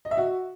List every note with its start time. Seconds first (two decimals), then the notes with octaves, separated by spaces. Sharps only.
0.05 D#5
0.11 E5
0.17 F#4